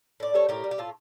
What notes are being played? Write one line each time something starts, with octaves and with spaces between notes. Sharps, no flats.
A2 D5
G3 A4 C#5
A2 G4 A#4
G3
G4
A2 F4 A4